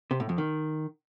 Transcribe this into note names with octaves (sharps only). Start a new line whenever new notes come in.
C3
A2
F2
D#3